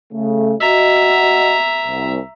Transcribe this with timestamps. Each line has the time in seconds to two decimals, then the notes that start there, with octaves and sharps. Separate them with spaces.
0.13 C#3 A3
0.60 F#4 D#5 E5 A#5
1.86 C2